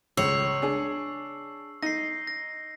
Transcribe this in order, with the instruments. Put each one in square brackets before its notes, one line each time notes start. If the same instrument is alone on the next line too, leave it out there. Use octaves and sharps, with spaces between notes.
[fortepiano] C#2 [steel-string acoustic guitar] C#5 [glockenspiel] E6 C7 F#7
[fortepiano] D4 G#4
[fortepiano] D#4 [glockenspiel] A#6 C7
[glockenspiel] A#6